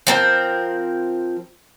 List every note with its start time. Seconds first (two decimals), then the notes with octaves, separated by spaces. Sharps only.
0.07 F3 C4 A#4